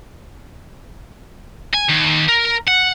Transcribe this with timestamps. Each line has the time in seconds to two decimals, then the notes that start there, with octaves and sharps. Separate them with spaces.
1.74 G#5
1.89 D#2
2.29 A#4
2.68 F#5